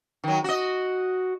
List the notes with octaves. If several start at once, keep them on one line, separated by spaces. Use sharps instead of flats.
D#3 F#3
F#4 D#5